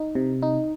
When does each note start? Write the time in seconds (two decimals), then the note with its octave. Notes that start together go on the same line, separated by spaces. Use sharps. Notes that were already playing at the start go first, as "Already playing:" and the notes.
Already playing: D#4
0.15 C3
0.42 D#4